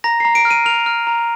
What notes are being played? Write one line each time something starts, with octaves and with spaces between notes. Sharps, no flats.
A#5 A#6
C7
A#5
D7
F6
D#7
F6 F7
F6
A#5